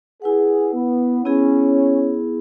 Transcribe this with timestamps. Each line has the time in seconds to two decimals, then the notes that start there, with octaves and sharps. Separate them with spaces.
0.22 E4 G#4 B4 F#5
0.74 B3
1.25 B3 C#4 E4 G#4